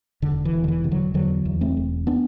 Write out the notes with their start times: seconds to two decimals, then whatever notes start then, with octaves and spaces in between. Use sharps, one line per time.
0.22 E1 D3
0.45 E3
0.53 E1
0.64 D3
0.68 E3
0.84 C3
0.91 D3 F#3
1.14 E2 D3 F#3
1.45 E2
1.61 A3 C4
1.77 E1
2.07 B3 D4